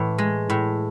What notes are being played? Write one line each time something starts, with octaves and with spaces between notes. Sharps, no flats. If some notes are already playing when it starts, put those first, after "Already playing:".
Already playing: A2 E3
G#3
A2